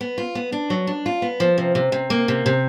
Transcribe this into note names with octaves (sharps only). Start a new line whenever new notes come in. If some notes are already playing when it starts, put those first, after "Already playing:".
B3
F4
B3
D4
F#3
D4
F4
B3
F3
C3
C3
C3
A#3
C3
C3